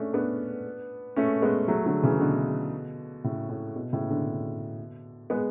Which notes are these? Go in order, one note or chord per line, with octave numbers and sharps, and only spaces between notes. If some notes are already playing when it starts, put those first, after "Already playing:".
Already playing: A3 C#4 D4
B3 D4
A3 C#4
G#3 B3
F#3 A3
D3 F#3
C#3 E3
B2 D3
A2 C#3
A2
B2
A2 C#3
B2 D3
G#3 B3